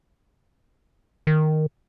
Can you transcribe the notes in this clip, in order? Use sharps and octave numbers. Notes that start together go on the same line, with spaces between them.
D#3